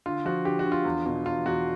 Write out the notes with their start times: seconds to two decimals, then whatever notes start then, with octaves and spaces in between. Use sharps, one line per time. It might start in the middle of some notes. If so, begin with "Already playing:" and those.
0.06 D3 F4
0.25 F3 F#4
0.45 D3 G4
0.59 F#4
0.66 D3
0.72 F4
0.85 E2
1.06 B2
1.26 E2 F4
1.46 E2 F#4